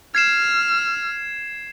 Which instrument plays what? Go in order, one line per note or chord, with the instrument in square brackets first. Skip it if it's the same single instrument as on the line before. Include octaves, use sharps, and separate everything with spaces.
[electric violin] F6 [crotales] G#6 C7 E7